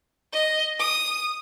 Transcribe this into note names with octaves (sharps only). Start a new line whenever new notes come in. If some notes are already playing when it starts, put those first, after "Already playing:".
D#5
D#6